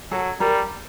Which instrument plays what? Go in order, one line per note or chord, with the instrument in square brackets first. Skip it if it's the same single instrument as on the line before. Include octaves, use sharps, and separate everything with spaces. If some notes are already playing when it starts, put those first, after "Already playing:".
[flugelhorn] F#3 [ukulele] A4
[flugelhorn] G3 [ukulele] A#4